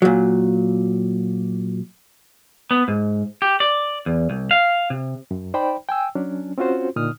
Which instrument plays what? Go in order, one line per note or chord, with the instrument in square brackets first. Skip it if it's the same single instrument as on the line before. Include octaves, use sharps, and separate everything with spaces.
[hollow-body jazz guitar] A#2 F#3
[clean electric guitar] B3
G#2
G4
D5
E2
C2
F5
C3
[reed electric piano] F#2
D#4 C5 D5 G5 B5
G5 G#5 E6
F#3 C#4 D4
C4 C#4 F4 F#4 C5
A#2 D3 D#4 D#6 F6